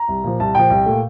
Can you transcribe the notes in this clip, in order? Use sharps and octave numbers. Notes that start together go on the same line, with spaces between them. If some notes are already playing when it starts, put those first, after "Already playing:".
Already playing: A#5
C2
A#2 F3
C2 A5
A#2 F3 G5
C2
A#2 A3